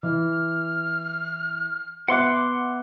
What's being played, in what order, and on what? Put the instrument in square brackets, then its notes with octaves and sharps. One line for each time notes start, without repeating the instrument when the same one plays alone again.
[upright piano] E3 [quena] F6
[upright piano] B3 E5 F#6 [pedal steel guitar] F#5 C6 D6